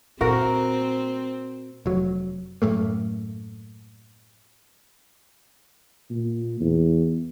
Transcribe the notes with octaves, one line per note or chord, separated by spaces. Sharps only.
A#2 C4 F#4 A#4
F1 F#3
F#2 A2 A3 A#3
A#2
E2